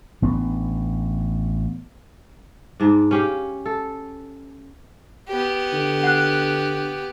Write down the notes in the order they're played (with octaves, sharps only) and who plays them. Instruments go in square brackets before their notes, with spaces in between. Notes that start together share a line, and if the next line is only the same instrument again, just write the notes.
[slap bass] A1 B3 D4
[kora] G#2 D4
C#4 G4 F5
A4
[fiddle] B3 G4
[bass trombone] D3
[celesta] F#5 F#6